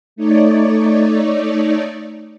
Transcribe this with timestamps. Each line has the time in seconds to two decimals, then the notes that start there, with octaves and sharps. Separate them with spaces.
0.16 A3 D#4 C#5 D5